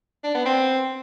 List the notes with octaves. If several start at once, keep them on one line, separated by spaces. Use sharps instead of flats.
D4
B3
C4